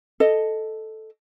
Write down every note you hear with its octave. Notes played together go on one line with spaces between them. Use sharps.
A4 D#5